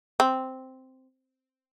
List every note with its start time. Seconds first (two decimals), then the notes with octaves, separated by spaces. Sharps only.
0.20 C4